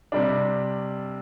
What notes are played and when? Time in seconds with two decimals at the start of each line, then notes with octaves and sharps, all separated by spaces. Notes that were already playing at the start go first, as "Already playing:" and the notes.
0.12 C3 G3 D4